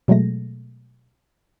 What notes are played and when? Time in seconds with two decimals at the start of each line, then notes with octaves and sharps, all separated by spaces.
0.08 B2 F#3 G#3 A3 A#6